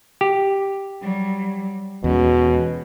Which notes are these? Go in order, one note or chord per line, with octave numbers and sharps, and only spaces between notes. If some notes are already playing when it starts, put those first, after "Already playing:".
G4
F#3 G3
E2 B2 G#3 C#4